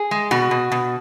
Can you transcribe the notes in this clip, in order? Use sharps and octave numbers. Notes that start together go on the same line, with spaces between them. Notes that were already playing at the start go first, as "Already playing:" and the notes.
Already playing: G#4
G#3
B2 F#4
B2
B2